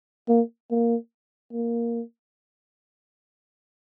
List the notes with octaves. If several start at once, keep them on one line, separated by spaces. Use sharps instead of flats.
A#3
A#3
A#3